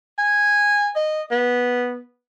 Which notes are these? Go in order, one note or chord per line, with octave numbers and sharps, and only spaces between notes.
G#5
D#5
B3